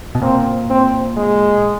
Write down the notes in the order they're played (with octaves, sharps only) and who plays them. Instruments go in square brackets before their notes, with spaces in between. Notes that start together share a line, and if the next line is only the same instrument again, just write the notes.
[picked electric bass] B2
[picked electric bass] A#2 [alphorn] C4
[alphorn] C4
G#3